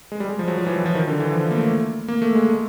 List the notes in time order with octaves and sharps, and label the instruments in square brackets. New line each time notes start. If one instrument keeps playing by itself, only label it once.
[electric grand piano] G#3
G3
G#3
F3
F#3
F3
E3
F#3
F3
D#3
D3
E3
F3
A#3
A3
A#3
A3
G#3
A3